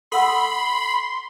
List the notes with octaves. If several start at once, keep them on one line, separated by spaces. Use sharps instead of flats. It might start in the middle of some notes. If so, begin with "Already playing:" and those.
A4 F#5 B5 C6 E6